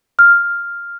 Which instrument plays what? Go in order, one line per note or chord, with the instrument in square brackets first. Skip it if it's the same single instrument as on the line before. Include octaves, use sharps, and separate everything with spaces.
[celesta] F6